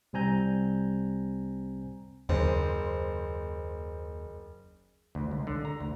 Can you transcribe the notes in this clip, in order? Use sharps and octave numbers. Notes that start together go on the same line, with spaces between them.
C2 G3 C4 G#5 A#5 G6
F#1 D#2 C5
D2
C#2
D3
A#5
D2